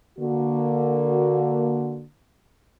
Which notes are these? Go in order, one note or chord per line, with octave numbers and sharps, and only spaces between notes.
D3 A#3 F#4